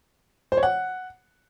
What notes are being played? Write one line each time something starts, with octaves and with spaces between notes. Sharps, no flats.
C5
C#5
F#5